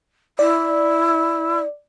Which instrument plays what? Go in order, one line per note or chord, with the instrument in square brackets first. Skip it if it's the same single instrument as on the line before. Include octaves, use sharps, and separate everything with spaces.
[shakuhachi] E4 [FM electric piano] D5